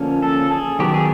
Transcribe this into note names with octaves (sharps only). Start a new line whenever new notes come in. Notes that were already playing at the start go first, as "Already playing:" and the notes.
Already playing: D3 F3 A#3 C#4
A4
G#4
D#3 F#3 B3 G4
G#4